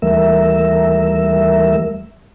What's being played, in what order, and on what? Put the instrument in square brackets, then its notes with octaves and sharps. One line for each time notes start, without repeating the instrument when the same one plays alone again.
[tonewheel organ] D#2 E3 G3 A3 A#4 E5